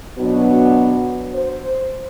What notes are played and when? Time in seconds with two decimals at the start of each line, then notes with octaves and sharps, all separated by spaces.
0.17 B2 F#3 B3 D4 F#4
1.34 C5